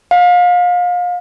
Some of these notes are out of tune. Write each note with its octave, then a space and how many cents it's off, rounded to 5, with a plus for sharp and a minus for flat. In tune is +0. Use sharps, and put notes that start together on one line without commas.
F5 +30